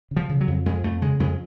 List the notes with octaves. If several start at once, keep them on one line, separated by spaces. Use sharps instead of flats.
C#3
F3
C#3
F#3
F2
F2 G#3
F2 A3
C#3 G#3
F2 G#3